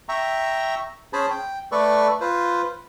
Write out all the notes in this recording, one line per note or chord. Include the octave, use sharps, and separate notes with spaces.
E5 G5 A#5 C#6
C#4 G#4 C5 G#5 A5 B5
G5
A3 A4 B4 D5 C#6
F4 B4 C5